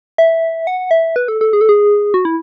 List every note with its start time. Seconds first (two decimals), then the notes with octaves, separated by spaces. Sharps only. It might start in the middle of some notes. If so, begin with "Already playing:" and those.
0.18 E5
0.67 F#5
0.91 E5
1.16 B4
1.28 A4
1.41 A4
1.53 G#4
1.61 A4
1.69 G#4
2.14 F#4
2.25 E4